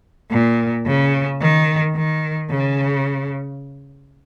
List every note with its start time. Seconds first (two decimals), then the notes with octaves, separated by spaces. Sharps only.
0.31 A#2
0.86 C#3
1.40 D#3
1.96 D#3
2.50 C#3